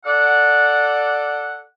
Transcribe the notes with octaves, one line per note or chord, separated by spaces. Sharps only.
A4 D5 F#5